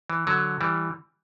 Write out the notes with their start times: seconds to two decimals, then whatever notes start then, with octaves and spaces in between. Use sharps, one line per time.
0.10 E3
0.27 D3 F#3
0.61 E3 G3